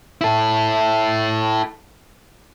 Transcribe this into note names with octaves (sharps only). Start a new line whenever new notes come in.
E4 A4